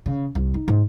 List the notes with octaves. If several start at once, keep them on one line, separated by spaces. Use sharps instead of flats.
C#3
C2
D#4
G#2